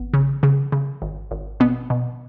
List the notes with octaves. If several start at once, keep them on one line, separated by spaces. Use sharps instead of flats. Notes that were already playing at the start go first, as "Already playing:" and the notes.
Already playing: G#1 B3
C#3
C#3
C#3
G#1
G#1
B2 B3
B2